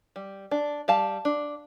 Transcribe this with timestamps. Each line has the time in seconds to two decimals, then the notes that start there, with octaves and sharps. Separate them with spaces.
0.16 G3
0.51 D4
0.88 G3 F5 A5
1.25 D4